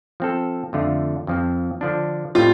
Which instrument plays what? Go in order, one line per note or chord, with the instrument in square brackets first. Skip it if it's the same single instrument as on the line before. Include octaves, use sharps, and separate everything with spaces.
[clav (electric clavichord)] F3 C4 A4
F2 D3 A3 F4
F2 F3 C4
D3 F3 D4
[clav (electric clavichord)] A2 G3 C4 [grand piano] F4